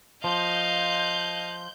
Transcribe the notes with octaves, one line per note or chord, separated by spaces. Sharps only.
F3 D#5 F5 G6